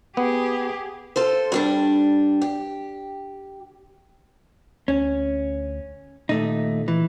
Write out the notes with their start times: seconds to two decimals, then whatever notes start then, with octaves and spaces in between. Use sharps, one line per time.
0.17 B3 G4 G#4
1.16 F4 A4 C5
1.52 G2 G3 D4
2.42 G4
4.88 D2 C#4
6.29 D#2 A#2 A3 D#4
6.88 E3